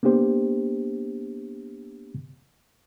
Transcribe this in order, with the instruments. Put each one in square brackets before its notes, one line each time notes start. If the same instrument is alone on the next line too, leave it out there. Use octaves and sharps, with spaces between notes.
[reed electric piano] A#3 B3 D4 G4 C5